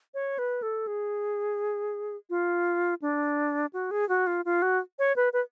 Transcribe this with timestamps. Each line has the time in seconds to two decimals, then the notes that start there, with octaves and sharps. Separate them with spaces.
0.14 C#5
0.39 B4
0.62 A4
0.87 G#4
2.30 F4
3.02 D4
3.73 F#4
3.91 G#4
4.09 F#4
4.27 F4
4.45 F4
4.62 F#4
4.99 C#5
5.16 B4
5.33 B4